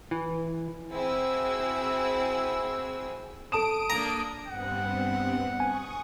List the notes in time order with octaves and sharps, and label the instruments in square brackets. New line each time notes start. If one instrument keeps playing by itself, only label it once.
[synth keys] E3
[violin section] C4 E4 F#4 G#4 E6
[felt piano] A4 A5 E7 [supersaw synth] D#6 D7
[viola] A#3 D4 [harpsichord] A#5
[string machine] G2 B3 C4 [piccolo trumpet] F#5
[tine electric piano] G#5 [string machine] C#6 D#6